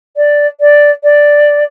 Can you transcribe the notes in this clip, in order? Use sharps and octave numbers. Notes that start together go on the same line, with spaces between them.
D5
D5
D5